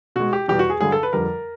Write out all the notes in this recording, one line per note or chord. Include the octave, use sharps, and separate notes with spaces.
B2 G#3 F#4
G4
E2 B2 G3 G4
F#4
G#4
G2 D3 F#3 G#4
A4
B4
F2 D3 G3 A#4